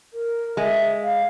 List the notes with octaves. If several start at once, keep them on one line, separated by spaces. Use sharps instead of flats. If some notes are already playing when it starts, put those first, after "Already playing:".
A#4
G#3 E5
F5